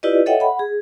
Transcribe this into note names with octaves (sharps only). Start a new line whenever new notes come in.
E4 F4 G4 B4 D5 D#5
A4 C#5 D#5 E5 F#5 G5
F#5 B5
G#4